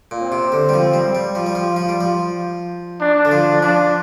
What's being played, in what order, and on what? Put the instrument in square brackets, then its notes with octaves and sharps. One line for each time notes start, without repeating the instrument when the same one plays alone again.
[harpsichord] A#2
[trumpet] C4
[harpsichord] C3
D3
G3
F3
G3
G3
F3
G3
F3
F3
G3
F3
[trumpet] D4
[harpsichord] D3
F3
[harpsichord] F3 [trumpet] D4